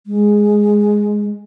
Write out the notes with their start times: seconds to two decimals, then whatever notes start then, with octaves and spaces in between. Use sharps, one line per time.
0.07 G#3